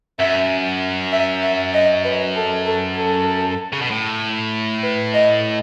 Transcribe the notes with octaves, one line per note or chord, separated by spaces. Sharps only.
F#2 E5
E5
E5
D#5
B4
A4
A4
A4
C#3
B2
A2
B4
D#5